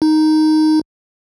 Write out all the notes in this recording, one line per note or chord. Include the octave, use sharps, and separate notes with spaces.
D#4